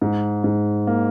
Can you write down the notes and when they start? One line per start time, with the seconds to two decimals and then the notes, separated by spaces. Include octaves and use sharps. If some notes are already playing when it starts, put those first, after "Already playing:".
0.02 G#2
0.44 G#2
0.87 A#3